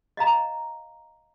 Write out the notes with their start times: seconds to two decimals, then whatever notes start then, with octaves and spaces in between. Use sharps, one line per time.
0.17 D#5 F5 A#5